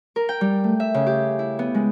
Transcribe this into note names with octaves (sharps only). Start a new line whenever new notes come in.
A#4
G5
G3
A3
E5
C#3
G4
E4
B3
G#3